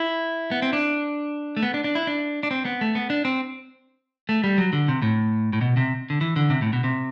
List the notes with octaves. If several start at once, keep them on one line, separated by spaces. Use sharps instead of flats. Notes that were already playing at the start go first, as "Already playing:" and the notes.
Already playing: E4
B3
C4
D4
A3
B3
D4
D4
E4
D4
D4
C4
B3
A3
B3
D4
C4
A3
G3
F#3
D3
C3
A2
A2
B2
C3
D3
E3
D3
C3
A2
B2
C3